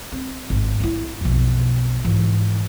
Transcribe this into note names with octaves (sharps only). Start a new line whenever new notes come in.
C4
G#1
D4 E4
B1 F2
G#2 E3